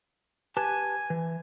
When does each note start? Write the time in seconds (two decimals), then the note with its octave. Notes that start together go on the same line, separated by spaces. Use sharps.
0.57 G4 B4 G#5 A5
1.10 E3